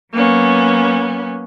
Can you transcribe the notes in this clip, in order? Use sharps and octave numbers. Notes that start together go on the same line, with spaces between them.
F#3 A#3 B3 C#4